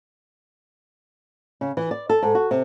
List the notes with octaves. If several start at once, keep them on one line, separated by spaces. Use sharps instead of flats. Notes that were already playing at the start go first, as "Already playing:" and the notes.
C#3
E3
D5
A4
G#2
F#4
C3